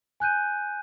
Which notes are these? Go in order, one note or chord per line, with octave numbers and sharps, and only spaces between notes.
G#5 F#6 G6 D#7